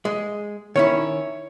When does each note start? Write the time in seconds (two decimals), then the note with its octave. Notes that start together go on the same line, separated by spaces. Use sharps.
0.05 G#3
0.76 D#3 C#4 E4 C#5